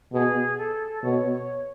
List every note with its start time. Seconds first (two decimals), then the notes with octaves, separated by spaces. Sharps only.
0.12 B2 G#4
0.57 A4
1.03 B2 C#5
1.32 C#5